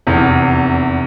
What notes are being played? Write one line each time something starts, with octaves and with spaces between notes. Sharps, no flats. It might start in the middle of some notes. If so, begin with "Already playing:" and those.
F1 E2 C3